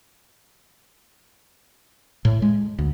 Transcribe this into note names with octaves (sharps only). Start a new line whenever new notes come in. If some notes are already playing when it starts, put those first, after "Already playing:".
A2
G#3
D2